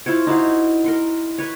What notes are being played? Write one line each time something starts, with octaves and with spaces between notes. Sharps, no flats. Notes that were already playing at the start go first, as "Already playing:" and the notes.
E4 F4 C5 C#5
D#4 E4 F#4 F5
A#4 F#5 C6
B4 C#5